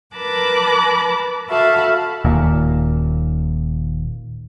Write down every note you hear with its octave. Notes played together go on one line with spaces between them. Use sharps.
A#4 B4 A5 B5 D6 F#6
F#4 A4 E5 F5 A5 B5
D#1 D#2 A#2